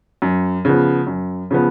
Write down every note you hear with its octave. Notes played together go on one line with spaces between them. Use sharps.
F#2
C#3 F3 B3
F#2
C#3 F3 B3